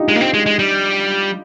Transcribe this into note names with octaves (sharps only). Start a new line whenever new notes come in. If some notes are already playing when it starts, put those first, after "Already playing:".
Already playing: D4 D#4 F4 G4
G#3
A#3
C4
G#3
G#3
G3